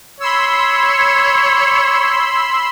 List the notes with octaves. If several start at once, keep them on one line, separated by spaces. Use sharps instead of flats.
C#5 B5 C6 E6